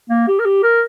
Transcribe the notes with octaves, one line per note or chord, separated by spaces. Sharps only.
A#3
G4
A#4
G4
A#4